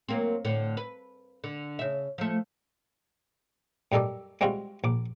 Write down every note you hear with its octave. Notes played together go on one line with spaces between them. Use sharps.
F#3 A#3 C4
A2 D3
B4
D3
C#3 E5
F3 A3
F#2 G3 D#4 A4 D5
G3 G#3 C4 F4 F#4
A#1 D6